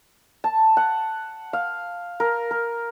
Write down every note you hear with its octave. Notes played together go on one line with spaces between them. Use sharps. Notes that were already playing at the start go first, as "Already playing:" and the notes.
A5
F#5
F5
A#4
A#4